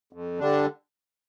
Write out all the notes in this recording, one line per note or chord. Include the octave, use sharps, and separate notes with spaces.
F2
D3 G3 D4